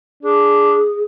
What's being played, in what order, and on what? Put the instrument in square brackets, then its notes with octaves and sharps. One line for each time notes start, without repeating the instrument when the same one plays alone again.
[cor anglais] D4 [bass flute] G#4